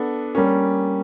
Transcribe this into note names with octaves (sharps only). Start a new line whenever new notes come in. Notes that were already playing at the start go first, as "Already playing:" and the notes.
Already playing: B3 D4 A4
G3 A#3 C#4